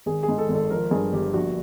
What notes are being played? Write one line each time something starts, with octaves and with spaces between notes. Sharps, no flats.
G#1 G#4
G#4
G#2
A4
G#1
A4
F3 A#4
G2 G#4
G1 G4
A#1 F#4